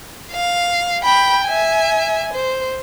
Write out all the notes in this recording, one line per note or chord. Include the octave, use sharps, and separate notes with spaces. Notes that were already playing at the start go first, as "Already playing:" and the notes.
F5
G5 B5
E5 G#5
C5